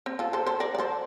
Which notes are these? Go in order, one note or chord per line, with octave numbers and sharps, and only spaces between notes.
C4
F4 A4
A4 C5
A4 C5
A#4 D5
D5
A4 C5